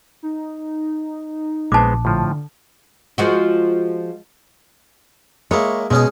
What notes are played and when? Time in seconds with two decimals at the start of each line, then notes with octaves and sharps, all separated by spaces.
0.23 D#4
1.72 A#1 G#3 B3 C5 A5 D6
2.05 A2 D3 F3
3.18 F3 G#3 F#4
5.51 G#3 A#3 E4 C#5
5.90 B2 G#3 C#4 G#4